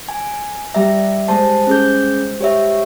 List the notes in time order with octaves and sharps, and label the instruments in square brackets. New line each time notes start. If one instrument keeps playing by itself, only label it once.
[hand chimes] G#5
[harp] G3 A#5 [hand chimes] E5
[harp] G#3 C5 [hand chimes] A5
[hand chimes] C#4 G#4 G6
G4 C#5 E5